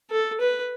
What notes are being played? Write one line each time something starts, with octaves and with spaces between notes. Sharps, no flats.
A4
B4